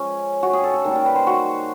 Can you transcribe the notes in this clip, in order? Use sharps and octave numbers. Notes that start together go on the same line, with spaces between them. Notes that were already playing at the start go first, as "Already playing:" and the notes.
Already playing: F3 G#3 C#4
F#4
G#4
A4
A4
D#3 G3 A#3 A#4
A#4
B4
C5
F#4